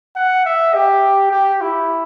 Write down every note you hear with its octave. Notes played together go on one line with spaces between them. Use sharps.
F#5
E5
G4
G4
E4